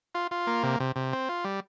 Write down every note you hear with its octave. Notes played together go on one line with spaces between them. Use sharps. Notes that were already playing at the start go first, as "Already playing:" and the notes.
F4
F4
A#3
C3
C3
C3
C4
F4
G3